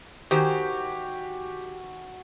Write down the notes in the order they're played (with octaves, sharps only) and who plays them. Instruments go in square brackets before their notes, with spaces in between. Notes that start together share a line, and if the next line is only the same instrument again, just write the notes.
[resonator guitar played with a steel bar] D#3 C5 [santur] F#4 G#5 [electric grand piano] G4